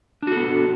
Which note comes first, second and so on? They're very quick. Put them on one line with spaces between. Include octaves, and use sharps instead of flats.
D4 F#4 A4 B3